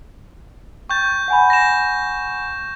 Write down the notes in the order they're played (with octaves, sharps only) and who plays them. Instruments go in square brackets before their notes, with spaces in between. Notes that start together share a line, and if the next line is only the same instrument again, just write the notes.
[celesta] G5 A6 [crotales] C#6 G6
[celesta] F#5 G#5 B5
[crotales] A#6 E7